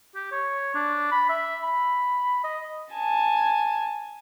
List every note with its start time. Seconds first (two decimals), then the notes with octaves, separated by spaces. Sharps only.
0.15 G4
0.32 C#5
0.75 D4
1.11 B5
1.29 E5
1.63 B5
2.44 D#5
2.93 G#5 A5